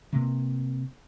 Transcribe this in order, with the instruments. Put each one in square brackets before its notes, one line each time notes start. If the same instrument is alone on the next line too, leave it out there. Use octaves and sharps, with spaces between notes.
[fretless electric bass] C3 A#3